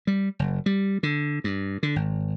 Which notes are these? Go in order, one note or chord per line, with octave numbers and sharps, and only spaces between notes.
G3
F#1
G3
D3
G2
D3
G#1